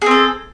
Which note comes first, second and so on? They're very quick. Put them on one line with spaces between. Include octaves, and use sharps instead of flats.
G#4 C4 A4